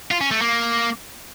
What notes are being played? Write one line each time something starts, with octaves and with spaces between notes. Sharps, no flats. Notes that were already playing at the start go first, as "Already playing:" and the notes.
F4
C#4
A3
A#3